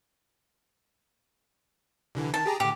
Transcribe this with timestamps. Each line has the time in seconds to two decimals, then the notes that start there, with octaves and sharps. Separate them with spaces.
2.15 C2 D3 E3
2.34 D#3 A5
2.46 G4 G#4 A#5
2.60 A2 D3 G4